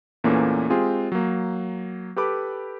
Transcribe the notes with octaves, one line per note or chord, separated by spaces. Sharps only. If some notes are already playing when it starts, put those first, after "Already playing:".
E2 A#2 E3 A3 A#3 C#4
G#3 C4 F4 G4 G#4
F#3 A#3
G4 A4 B4 B5 D6